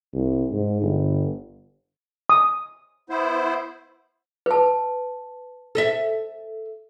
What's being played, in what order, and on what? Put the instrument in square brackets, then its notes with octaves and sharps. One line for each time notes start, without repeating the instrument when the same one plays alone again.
[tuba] C2
G#2
G1
[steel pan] D#6
[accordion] B3 E4 C5
[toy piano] B4 A5
[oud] A4 D#5 E5